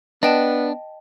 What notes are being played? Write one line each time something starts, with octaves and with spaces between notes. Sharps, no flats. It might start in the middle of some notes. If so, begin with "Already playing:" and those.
B3 D4 D#5 G5 A5